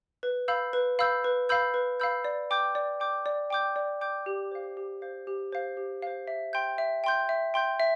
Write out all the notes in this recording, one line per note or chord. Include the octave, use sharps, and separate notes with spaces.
B4
F5 B5 E6 G6
B4
F5 B5 E6 G6
B4
F5 B5 E6 G6
B4
F5 B5 E6 G6
D5
G5 D6 G6
D5
G5 D6 G6
D5
G5 D6 G6
D5
G5 D6 G6
G4
C5 F5
G4
C5 F5
G4
C5 F5
G4
C5 F5
E5
G5 C6 G6
E5
G5 C6 G6
E5
G5 C6 G6
E5